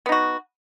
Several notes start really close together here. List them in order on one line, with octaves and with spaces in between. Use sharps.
B3 D#4 F#4